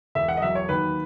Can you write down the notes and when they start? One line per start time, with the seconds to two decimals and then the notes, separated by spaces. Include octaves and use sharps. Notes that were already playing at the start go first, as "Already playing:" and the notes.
0.15 E1 E5
0.29 F#5
0.37 D#5
0.42 F#3 E5
0.55 C#5
0.69 D#2 B4